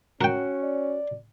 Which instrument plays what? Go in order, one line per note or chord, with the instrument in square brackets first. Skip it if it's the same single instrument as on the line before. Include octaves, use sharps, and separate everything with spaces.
[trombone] C#4 [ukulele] F#4 [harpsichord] A#4 G5
[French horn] D5